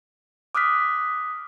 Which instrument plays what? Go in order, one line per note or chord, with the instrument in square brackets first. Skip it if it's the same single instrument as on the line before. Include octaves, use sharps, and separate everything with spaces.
[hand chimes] D6 D#6 F6 F#6 B6